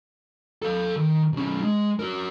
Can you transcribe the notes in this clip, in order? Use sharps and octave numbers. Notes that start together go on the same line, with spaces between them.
A4 F5
D#3
B1 C#4
G#3
F#4 A#4